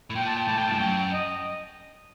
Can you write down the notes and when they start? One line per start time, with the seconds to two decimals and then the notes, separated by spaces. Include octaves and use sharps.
0.10 A2
0.15 A#2 G5
0.25 A5
0.37 G5
0.47 A2 A5
0.58 A2 G5
0.68 G2 A5
0.78 F#2 G5
1.12 D#5